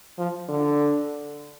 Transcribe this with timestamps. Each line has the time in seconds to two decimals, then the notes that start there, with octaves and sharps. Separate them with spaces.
0.18 F3
0.49 D3